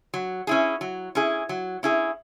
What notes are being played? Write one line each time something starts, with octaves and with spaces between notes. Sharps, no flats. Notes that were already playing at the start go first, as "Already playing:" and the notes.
F#3
C#4 E4 G#4
F#3
C#4 E4 G#4
F#3
C#4 E4 G#4